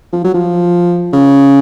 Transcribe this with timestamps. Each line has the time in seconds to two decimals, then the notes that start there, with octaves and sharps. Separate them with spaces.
0.13 F3
0.24 F#3
0.34 F3
1.13 C#3